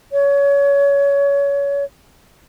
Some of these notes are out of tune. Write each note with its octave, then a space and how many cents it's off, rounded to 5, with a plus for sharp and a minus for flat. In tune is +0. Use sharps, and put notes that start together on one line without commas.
C#5 +25